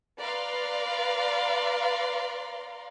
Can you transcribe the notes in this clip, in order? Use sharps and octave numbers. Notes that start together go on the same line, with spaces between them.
B4 D5 F5 A#5 C6